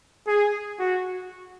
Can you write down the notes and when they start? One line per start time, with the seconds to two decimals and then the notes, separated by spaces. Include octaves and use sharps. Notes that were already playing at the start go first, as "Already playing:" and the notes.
0.27 G#4
0.79 F#4